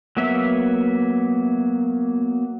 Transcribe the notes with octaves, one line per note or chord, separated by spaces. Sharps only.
F#3 A#3 B3 E5